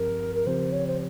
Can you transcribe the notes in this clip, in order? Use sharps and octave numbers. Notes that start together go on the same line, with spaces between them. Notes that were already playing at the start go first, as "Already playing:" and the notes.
Already playing: G2 F3 C4 G4 A#4
A#4
C#3 F3 C4 G4 C5
C#5
C5